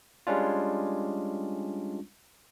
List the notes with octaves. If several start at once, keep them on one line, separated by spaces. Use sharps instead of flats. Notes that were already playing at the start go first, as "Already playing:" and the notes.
G3 G#3 C#4 D4 F4